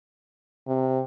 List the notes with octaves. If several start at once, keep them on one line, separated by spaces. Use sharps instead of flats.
C3